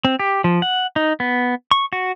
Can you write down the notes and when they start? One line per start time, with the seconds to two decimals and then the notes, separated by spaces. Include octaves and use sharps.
0.05 C4
0.19 G4
0.44 F3
0.62 F#5
0.96 D#4
1.20 B3
1.71 C#6
1.93 F#4